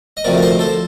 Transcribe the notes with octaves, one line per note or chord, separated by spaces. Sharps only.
D#5
D2 C3 F3 A3 A#4 D5
F5
C5 D#5
A4 C5